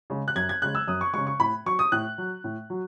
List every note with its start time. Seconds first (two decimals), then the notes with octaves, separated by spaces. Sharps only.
0.10 C#3 G#3
0.28 F#6
0.36 F#2 G#6
0.49 G#6
0.62 C#3 G#3 F#6
0.75 E6
0.87 F#2 D#6
1.01 C#6
1.13 C#3 G#3 C#6
1.27 C#6
1.40 A2 B5
1.66 F#3 C#6
1.79 D#6
1.92 A2 F#6
2.18 F#3
2.44 A2
2.70 F#3